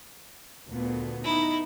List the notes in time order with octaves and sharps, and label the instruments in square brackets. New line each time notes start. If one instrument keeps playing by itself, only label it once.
[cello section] D2 A#2 B3
[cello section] B3 D#4 [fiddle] E4